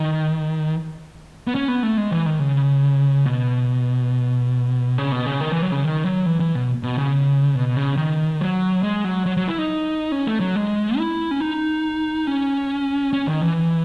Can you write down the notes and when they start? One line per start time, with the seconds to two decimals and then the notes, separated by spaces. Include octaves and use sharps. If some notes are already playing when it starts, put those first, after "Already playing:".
Already playing: D#3
1.47 B3
1.55 C#4
1.68 B3
1.83 A3
1.97 G#3
2.11 E3
2.26 D#3
2.40 C#3
3.26 B2
4.98 C#3
5.12 B2
5.26 C#3
5.41 D#3
5.52 E3
5.62 F#3
5.72 C#3
5.84 D#3
6.05 F#3
6.26 E3
6.40 E3
6.55 B2
6.83 B2
6.98 C#3
7.55 B2
7.76 C#3
7.97 D#3
8.41 F#3
8.83 G#3
9.05 F#3
9.26 F#3
9.37 F#3
9.48 E4
9.58 D#4
10.12 C#4
10.27 A3
10.40 F#3
10.56 G#3
10.98 E4
11.31 C#4
11.40 D#4
12.27 C#4
13.13 C#4
13.27 D#3
13.41 E3